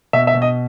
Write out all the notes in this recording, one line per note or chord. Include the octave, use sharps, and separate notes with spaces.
B2 E5
E5
B2
D#5